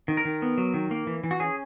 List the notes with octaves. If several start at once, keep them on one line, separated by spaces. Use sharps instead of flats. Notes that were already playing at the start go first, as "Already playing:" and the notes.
D#3
A#4
D#3
B3
F#3
D#3
A#3
E3
E3
F#4
C#4 G#4